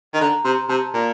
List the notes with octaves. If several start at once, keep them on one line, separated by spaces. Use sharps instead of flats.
D#3
D3 A#5
C3 C6
C3 A5
A#2